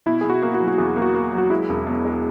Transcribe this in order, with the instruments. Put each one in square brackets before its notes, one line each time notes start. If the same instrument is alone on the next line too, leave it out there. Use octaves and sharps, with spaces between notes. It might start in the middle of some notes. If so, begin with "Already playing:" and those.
[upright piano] B2 [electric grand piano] E4
[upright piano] B2 [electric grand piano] G#4
[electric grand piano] F#4
[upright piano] A#3
[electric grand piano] F#4
[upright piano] F#3
[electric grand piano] F#4
[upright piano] E2 [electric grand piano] G#4
[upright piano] A#3
[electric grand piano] F#4
[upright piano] A#3
F#3
[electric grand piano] F#4
[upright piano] G#3 [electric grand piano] E4
[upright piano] E1
B2
G#3